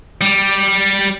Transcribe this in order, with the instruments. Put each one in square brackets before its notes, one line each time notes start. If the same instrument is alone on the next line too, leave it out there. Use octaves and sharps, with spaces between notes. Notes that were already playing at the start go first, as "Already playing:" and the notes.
[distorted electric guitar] G3